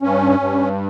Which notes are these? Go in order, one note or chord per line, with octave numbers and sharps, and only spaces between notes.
G2 C#4
G2